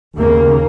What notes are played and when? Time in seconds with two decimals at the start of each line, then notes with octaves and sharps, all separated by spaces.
0.18 D#2 C#3 A#3